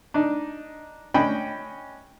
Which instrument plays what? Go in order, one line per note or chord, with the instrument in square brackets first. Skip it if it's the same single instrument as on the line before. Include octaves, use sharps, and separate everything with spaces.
[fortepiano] D4 D#4
C#4 D4 D#5 G5 B5